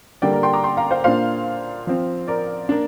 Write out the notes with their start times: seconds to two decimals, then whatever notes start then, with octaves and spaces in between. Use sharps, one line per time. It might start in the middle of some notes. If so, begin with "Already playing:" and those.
0.22 D3 G3 A#3 D5 G5
0.33 A#4 D5
0.43 G5 C6
0.53 A#5 D6
0.64 G5 C6
0.77 F5 A#5
0.91 C5 F5
1.04 A#2 A#3 D4 C5 F5
1.87 F3 C4
2.28 A#4 D5
2.69 A#3 D4